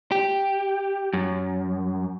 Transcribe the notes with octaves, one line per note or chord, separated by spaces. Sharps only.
G4
F#2